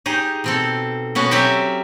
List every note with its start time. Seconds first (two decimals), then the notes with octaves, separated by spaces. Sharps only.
0.06 D#4 G4 G#4
0.44 B2 C4 A4
1.15 B2 B3 C#4 F#4
1.31 F#3 C4 C#4 G4 E5